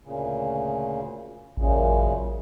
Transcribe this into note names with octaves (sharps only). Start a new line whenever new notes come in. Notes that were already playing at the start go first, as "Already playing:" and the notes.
D2 A#2 C#3
A1 F#2 A#2 C#3